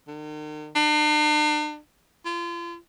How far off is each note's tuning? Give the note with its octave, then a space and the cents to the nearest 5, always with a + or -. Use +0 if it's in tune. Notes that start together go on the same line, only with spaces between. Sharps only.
D#3 -40
D4 +45
F4 -35